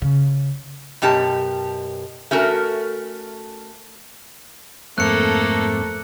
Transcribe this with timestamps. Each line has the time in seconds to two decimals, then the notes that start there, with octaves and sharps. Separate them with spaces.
0.02 C#3
1.02 F#2 B2 G4 A5
2.31 A3 C#4 F#4 A#4
4.98 F2 G#2 A3 A#3 C4 A4 F#6 C#7